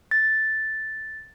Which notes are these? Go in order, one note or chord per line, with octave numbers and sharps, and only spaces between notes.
A6